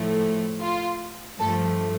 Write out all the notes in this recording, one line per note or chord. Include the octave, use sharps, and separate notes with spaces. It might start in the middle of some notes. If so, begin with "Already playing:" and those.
Already playing: A2 F3 A3
F4
G2 F3 A3 A4